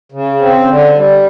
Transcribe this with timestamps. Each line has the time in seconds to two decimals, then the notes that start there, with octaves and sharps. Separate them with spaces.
0.12 C#3
0.40 C4
0.67 D3
0.95 G3